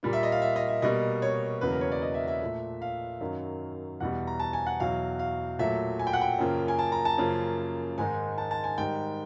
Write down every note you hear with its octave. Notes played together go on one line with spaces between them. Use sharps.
A#2 G3 A#3
E5
D#5
F5
E5
D#5
E5
B2 G3 A#3 D#5
C#5
E2 C#3 F#3 A#3 B4
A#4
C#5
D5
D#5
E5
E5
A#2 F3 A3
F5
F#2 D#3 F#3
E2 B2 G3 F#5
A#5
A5
G#5
F#5
E2 B2 F#3 F5
F5
A#2 F#3 A3 E5
G#5
G5
F#5
G5
F#2 C#3 F3 A#3
G#5
A5
A#5
A5
F#2 C#3 F3 A#3
G#2 D#3 G#3 G#5
A5
A5
G#5
G#2 D#3 G3 G5